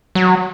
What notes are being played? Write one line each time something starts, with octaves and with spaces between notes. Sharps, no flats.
F#3